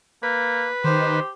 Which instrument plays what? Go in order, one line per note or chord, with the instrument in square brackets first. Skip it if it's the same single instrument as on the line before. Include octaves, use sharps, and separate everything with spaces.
[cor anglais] A#3 [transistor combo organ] B4
[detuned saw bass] D#3 [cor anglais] G4 [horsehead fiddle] C5